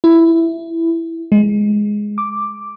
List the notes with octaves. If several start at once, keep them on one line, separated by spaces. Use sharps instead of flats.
E4
G#3
D6